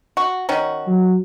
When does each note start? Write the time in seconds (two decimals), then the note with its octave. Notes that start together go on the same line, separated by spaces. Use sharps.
0.17 F#4
0.49 D#3 C#4 F#4
0.87 F#3